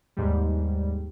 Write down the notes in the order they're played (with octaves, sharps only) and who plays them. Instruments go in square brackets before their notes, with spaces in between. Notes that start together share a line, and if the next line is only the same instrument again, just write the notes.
[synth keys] D#2 G#2 G3